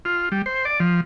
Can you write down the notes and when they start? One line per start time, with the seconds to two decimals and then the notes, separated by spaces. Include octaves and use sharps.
0.05 F4
0.32 G3
0.46 C5
0.65 D5
0.80 F3